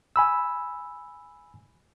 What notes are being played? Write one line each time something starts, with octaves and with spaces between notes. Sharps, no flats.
G#5 B5 E6